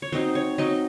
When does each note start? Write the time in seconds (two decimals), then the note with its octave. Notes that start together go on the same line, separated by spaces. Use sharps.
0.02 C#5
0.12 F#3 C4 D#4 C5
0.35 C#5
0.58 F#3 C4 D#4 D#5